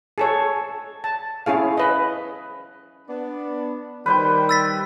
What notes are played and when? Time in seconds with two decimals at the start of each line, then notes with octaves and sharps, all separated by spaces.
0.18 G#4 A4 C#5
1.04 A5
1.46 C#4 E4 G#4 F5
1.77 B4 D#5
3.08 B3 D4
4.06 D#3 G3 B4 C5 G5
4.49 E6 A6 B6